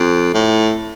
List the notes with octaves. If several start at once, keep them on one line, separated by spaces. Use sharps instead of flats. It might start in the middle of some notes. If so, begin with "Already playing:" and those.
Already playing: F2
A2